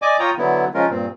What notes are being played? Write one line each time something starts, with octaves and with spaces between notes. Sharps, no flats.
D5 D#5 G#5 D6
F4 C#5 G5 A#5 D#6
D3 F#3 B3 E4
C#3 F3 G#3 C#4 F4 A#4
G2 A#2 C4